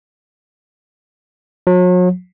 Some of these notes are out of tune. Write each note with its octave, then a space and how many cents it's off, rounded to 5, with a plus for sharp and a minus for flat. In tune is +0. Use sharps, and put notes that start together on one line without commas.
F#3 -40